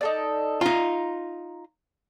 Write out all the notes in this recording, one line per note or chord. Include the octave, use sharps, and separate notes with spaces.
D#4 A4 D5
D#4 F4 A#5 C6